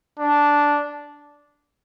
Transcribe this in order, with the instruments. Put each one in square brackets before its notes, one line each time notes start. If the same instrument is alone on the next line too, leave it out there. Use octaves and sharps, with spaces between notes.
[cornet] D4